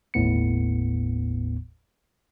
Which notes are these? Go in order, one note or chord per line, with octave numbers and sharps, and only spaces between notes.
G1 D#2 A2 B3 C#7